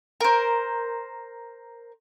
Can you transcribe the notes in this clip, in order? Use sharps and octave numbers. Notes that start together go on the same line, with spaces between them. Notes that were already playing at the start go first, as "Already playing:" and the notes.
A#4 C5